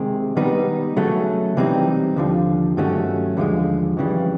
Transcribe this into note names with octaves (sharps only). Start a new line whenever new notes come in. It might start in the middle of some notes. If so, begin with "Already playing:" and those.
Already playing: C3 D#3 G#3 C4
D#3 G3 B3 D#4
C#3 F#3 A3 C#4
C3 E3 G3 C4 D#4
D#2 D3 F3
G2 D#3 F#3 A3 C#4
D#2 D3 F3 G#3
F2 C#3 E3 G3